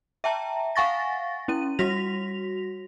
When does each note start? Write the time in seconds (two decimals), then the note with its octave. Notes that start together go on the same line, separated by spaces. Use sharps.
0.24 E5 G5 A5 A#5
0.76 F5 F#5 G#5 C#6 A6 A#6
1.48 C#4 E4 D#7
1.79 G3 F#4 A#6 B6 F7